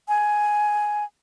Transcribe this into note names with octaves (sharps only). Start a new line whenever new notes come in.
G#5